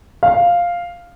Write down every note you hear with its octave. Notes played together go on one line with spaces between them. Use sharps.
F5